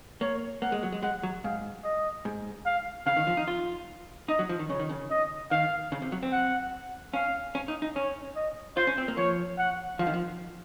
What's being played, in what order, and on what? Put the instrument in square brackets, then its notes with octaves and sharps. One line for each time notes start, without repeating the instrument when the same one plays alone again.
[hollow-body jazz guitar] A#3 [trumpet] C#5
[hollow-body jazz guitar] A#3 [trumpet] F#5
[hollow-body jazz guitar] G#3
F#3
G#3
[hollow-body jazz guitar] G#3 [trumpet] F#5
[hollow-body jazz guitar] F#3
[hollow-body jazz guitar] G#2 [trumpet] F5
[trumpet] D#5
[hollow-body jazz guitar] G#2
[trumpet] F5
[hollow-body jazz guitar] C#3 [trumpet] F5
[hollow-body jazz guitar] D#3
F3
D#4
F4
[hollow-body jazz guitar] D#4 [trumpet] D#5
[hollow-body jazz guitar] F#3
F3
D#3
[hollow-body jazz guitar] C#3 [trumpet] C#5
[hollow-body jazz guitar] D#3
C#3
[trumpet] D#5
[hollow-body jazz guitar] D#3 [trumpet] F5
[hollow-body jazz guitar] C#3
C3
F#3
C4
[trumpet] F#5
[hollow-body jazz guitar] C#4 [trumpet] F5
[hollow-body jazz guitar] C#4
D#4
D#4
[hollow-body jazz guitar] C#4 [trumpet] C#5
[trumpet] D#5
[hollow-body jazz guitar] F4 [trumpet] C5
[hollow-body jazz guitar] C#4
C4
A#3
[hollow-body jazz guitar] F3 [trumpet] C#5
[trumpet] F#5
[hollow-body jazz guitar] F3 [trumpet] F5
[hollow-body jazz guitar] D#3
F3